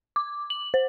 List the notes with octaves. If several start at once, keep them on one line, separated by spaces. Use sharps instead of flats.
D6
F#7
C5